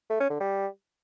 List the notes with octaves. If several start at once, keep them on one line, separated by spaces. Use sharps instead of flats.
A3
C#4
D3
G3